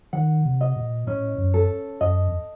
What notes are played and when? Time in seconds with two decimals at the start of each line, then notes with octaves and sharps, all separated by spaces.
0.13 D#3 F#5
0.45 C3
0.61 D#5
0.76 A#2
1.07 A2 C#4
1.38 F#2
1.54 A4
2.01 F#2 D#5
2.28 F2